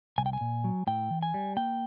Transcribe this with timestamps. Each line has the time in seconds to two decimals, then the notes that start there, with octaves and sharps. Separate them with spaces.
0.18 C2 G#5
0.26 G5
0.33 G#5
0.41 A#2
0.64 F#3
0.87 A2 G5
1.11 E3
1.23 G#5
1.34 G3
1.57 A#3 G5